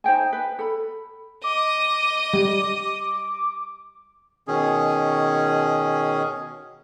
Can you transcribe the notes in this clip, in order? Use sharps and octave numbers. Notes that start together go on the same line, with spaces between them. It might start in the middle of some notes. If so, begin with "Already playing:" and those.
D#4 C5 G5 G#5
B4
A4 B5
D#5 D6
G3
B2 D#3 C#4 G#4